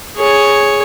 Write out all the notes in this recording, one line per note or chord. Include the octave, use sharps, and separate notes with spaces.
G#4 C#5